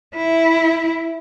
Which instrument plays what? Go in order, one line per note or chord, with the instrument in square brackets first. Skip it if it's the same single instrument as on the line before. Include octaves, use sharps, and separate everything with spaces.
[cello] E4